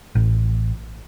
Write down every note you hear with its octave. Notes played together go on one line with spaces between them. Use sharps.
A1